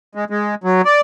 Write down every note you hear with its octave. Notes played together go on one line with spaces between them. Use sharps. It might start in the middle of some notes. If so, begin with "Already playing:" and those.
G#3
G#3
F#3
D5